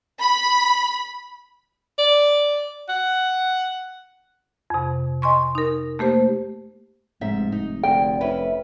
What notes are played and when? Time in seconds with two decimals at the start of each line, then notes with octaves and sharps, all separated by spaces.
0.20 B5
1.98 D5
2.89 F#5
4.70 F2 C3
5.22 D#5 G#5 C6 C#6
5.55 D#4 A#4
5.99 A3 A#3 G4 C5
7.21 F1 G#2 G#3 E5
7.52 D#4
7.83 D2 D5 G5
8.21 F2 C#4 B4 E5